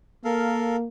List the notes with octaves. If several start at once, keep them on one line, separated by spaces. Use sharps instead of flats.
A#3 A4 A#4 F5